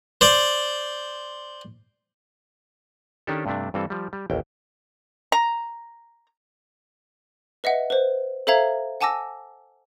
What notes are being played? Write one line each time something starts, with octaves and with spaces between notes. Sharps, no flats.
C5 D5
D#3 C#4 D4 G4 A4
G2 C3 A3 D4
G2 E3 G3 C4 A4
F3 G3
G3
A1 D#2 G5
A#5
B4 D#5 E5 F#5
B4 C5
A4 C5 E5 F5 A#5 G#6
F#5 G#5 A5 D6 E6 A#6